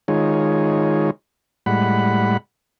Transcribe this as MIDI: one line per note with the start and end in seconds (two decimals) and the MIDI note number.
0.08 1.11 51
0.08 1.11 56
0.08 1.11 63
0.08 1.11 65
0.08 1.11 68
0.08 1.11 73
1.66 2.37 45
1.66 2.37 55
1.66 2.37 56
1.66 2.37 78
1.66 2.37 83